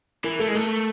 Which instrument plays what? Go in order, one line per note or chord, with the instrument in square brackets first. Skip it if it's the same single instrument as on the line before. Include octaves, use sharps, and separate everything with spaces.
[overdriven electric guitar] E3 [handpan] A#4
[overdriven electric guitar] A3 [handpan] A4
[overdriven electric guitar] G#3
[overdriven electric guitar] A3 [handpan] A4